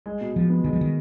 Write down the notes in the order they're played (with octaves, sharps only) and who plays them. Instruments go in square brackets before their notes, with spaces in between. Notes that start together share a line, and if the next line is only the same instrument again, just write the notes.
[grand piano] G#3
B2
[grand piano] B2 [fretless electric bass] F3
[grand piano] B3
[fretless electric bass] D#3 [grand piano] G#3
[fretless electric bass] F3
[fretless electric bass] D#3 [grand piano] G#3